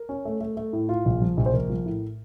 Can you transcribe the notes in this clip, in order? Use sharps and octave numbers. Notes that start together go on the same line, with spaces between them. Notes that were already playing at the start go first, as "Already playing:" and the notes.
Already playing: A#4
C#4
A3
A3
A3
A2
F4
A#1
F3
A#1
C5
A#1 A#4
F3
A2